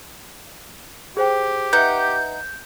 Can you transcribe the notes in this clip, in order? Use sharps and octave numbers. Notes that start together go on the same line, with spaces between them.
G4 G#4 C5 G5
D#4 B4 E5 F#5 G6